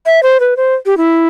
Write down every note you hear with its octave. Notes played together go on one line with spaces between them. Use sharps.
E5
C5
B4
C5
G4
E4